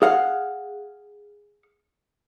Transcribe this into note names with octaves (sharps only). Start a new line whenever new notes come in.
G#4 F5 F#5